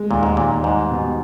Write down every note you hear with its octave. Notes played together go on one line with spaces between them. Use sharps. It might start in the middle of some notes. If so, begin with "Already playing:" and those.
Already playing: G#3
D#2 A#2
G#2
D#2 A#2
G#2 G3
B2